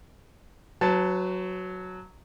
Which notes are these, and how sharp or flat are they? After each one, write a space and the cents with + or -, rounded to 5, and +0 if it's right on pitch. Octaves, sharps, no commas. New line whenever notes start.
F#3 +0 B4 +35 A5 +0